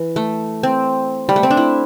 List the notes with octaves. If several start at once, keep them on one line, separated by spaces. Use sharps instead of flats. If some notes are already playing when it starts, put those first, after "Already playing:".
Already playing: E3
A3
C4
G3
A3
C4
D4
E4